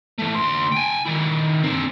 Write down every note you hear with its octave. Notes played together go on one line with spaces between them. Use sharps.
E3 A3
D2 C6
G5 G#5
D#3 E4
C4 D4